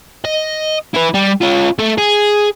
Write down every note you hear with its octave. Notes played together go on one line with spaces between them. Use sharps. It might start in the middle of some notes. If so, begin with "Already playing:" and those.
D#5
E4 B4
G3
C#4 F4
A3 A4
G#4